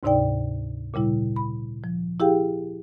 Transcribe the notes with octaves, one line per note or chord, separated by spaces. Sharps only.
D2 G#2 C3 D#4 D5 G5
A#2 C#3 G3 E4
B5
F3
E4 G4 G#4 F5 G5